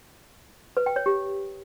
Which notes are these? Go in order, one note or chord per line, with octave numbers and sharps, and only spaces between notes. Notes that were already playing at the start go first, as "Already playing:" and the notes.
B4
G5
C#5
G4